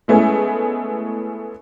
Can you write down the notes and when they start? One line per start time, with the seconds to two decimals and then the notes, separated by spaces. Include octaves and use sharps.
0.08 G#3 A3 B3 C#4 E4 G#4